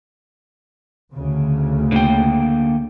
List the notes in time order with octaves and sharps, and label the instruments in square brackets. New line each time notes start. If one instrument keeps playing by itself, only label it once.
[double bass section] D2 C#3
[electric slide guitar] D3 A#3 G5